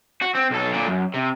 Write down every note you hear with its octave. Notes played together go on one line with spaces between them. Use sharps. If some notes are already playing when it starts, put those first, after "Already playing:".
F#4
C4
B1 A4
A#2 D3
F#2
C3